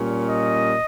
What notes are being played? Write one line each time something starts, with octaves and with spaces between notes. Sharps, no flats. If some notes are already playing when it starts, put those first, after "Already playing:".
Already playing: A#2 G3 C#4
D#5